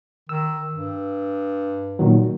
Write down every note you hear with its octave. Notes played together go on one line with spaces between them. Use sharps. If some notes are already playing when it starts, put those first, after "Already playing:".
D#3 E6
G2
A#2 D#3 F#3